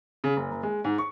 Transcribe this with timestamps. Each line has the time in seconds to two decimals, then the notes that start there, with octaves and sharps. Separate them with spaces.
0.24 C#3
0.37 F#1
0.51 F#1
0.63 G#3
0.84 G#2
0.98 C#6